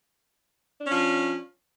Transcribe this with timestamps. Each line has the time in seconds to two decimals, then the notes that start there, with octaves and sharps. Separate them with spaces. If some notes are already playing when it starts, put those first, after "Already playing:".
0.81 D4
0.85 C#4
0.89 F3